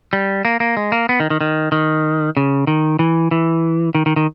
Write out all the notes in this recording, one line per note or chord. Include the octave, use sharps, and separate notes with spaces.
G3
A#3
A#3
G#3
A#3
B3
D#3
D#3
D#3
D#3
C#3
D#3
E3
E3
D#3
D#3
D#3